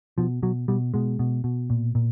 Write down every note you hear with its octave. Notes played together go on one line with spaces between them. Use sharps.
B2 F3
B2 F#3
B2 G3
B2 G#3
B2
B2
A#2
A#2